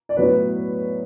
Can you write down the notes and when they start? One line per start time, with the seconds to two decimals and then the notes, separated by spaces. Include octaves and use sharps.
0.09 D5
0.17 A2 F#3 B3 B4 C#5